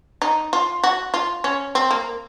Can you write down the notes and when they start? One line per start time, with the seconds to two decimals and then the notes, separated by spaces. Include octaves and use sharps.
0.22 D#4
0.53 F4
0.84 F#4
1.14 F4
1.44 C#4
1.75 C4
1.91 A#3